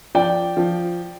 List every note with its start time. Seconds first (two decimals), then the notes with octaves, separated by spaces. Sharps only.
0.15 F3 D5 G5
0.57 F3